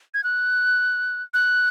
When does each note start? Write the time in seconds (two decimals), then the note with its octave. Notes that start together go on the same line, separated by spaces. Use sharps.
0.14 G#6
0.24 F#6
1.34 F#6